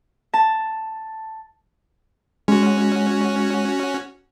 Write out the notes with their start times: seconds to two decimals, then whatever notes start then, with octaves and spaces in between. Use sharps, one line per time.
0.34 A5
2.48 G#3 C#4 F#4